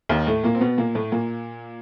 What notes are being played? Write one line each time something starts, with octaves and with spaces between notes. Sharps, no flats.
D#2 D#3
A2 A3
A#2 A#3
C4
B2 B3
A#2 A#3
A2 A3
A#2 A#3